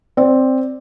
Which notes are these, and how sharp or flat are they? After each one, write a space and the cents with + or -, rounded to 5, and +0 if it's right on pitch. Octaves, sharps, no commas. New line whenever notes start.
C4 +5 D5 +0